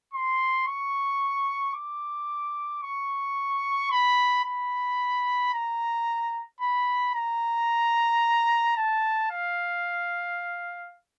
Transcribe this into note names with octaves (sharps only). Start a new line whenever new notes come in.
C6
C#6
D6
C#6
B5
B5
A#5
B5
A#5
A5
F5